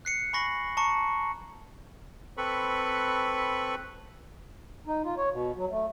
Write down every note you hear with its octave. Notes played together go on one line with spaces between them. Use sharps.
F#6 C7 C#7
G#5 B5 C#6 A#6 C7 F#7
A5 A#5 C#6 D6 C#7
C4 A4 B4 B5 C#6
D#4
F4
C#5
B2
F#3
A3